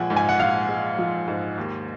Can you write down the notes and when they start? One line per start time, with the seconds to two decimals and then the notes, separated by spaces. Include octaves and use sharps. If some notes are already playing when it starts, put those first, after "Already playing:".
Already playing: A#1 F3 G#3 F#5 G#5
0.10 G#2
0.16 G#5
0.29 F#5
0.40 A#1 F5
0.69 G#3
0.98 F3
1.28 G#2
1.58 D#2